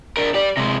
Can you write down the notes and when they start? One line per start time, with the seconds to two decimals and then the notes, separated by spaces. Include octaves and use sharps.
0.17 D4 A#4
0.34 G4 D5
0.57 C3 G#3